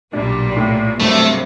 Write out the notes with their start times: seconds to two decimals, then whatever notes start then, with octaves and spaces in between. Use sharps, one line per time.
0.13 B1 A#2 G3 D4
0.56 A2
1.00 G2 C3 F#3 A3 A#3